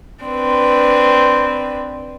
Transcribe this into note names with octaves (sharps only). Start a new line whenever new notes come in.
C4 D4 B4